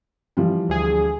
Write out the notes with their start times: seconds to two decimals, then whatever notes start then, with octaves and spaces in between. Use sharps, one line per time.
0.37 E3 F3 G3
0.69 D2 G#4